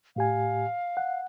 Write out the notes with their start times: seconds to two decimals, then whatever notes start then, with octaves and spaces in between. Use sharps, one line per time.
0.16 A2 G4 F5 G#5
0.97 F#5